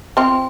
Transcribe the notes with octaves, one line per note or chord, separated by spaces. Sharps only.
C4 F4 C6